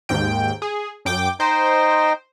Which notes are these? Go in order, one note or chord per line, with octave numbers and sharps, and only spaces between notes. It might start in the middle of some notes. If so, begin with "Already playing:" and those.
D#2 G#2 G5
G#4
F#2 G5 D6
D#4 C5 D#5 G5